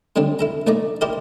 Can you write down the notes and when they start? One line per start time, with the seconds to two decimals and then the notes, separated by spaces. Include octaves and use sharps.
0.16 D3 F#3 G3 C4 D4
0.39 E4 A4 A#5
0.67 A#1 A3 D#4 D5 A#5
1.01 E4 G4 A#4 C5 D5 D#5